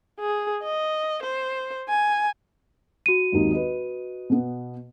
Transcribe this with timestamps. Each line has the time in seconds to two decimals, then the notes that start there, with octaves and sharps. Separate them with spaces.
0.20 G#4
0.63 D#5
1.22 C5
1.88 G#5
3.06 F#4 D#7
3.32 G#1 D#2 D#4
3.51 B4 D#5
4.30 B2 B3